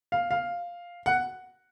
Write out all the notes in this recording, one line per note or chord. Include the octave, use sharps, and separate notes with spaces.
F5
F5
F#5